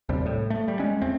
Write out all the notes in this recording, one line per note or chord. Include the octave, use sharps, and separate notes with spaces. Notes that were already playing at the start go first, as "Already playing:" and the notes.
A#1 D#2 C3 G3
A2
A3
G3
G#3 C#4
E2 A3 C4